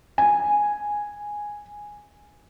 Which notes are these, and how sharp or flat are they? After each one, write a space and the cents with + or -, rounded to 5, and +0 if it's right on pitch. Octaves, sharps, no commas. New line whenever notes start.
G#5 -5